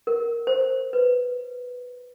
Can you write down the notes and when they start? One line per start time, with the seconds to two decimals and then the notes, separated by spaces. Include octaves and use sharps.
0.07 A#4
0.47 C5
0.93 B4